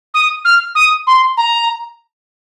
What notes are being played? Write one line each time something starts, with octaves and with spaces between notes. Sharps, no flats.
D#6
F6
D#6
C6
A#5